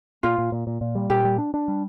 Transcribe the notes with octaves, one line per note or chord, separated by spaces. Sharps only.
A#2 F4
A#2
A#2
A#2
A#2
G3
A#2 G4
G3
D4
D4
G3